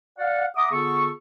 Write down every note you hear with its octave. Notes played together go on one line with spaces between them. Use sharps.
D5 F5 F#5
E5 F#5 A#5 D6 D#6
D3 B3 F4 G#4 A4 C#6